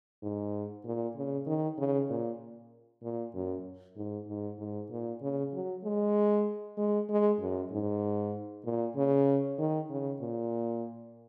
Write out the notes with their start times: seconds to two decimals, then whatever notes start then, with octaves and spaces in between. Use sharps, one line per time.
0.23 G#2
0.85 A#2
1.16 C#3
1.46 D#3
1.78 C#3
2.10 A#2
3.03 A#2
3.34 F#2
3.96 G#2
4.28 G#2
4.59 G#2
4.91 A#2
5.22 C#3
5.53 F#3
5.84 G#3
6.78 G#3
7.09 G#3
7.40 F#2
7.72 G#2
8.65 A#2
8.96 C#3
9.58 D#3
9.90 C#3
10.21 A#2